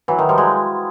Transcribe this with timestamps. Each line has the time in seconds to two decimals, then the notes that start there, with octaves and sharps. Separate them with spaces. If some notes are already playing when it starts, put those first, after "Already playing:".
0.08 E3 F#3
0.19 D#3
0.29 F3 G3
0.38 F#3 G#3